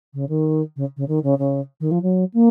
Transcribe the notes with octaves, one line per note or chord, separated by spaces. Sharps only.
C#3
D#3
C#3
C#3
D#3
C#3
C#3
D#3
F3
F#3
A#3